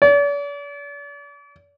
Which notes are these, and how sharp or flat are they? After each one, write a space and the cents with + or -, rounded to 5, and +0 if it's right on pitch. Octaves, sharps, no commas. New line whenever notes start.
D5 -45